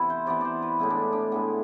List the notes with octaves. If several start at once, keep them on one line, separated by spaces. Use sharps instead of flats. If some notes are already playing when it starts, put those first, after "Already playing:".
Already playing: C3 E3 B3 E4
C5
C3 E3 B3 D5
C5 D5
B4
A2 G#3 B3 E4
D4
D4
A2 G#3 B3